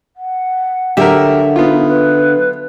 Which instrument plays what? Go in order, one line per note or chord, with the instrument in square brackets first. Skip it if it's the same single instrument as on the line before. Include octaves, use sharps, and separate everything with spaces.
[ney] F#5
[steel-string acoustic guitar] D3 F#3 E5 [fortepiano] G4 A#4
[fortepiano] B3 F4 [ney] D#4
[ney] B4